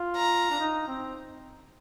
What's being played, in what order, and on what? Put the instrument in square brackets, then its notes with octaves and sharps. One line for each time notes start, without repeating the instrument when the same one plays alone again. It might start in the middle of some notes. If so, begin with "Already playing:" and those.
Already playing: [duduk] F4
[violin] A#5
[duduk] D4
D#4
C4